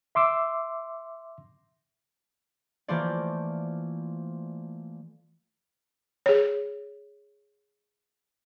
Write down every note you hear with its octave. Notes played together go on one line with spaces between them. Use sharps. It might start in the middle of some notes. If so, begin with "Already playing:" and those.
E5 C6 D6 E6
E3 A3 A#3 F4 C5 D5
G#4 C#5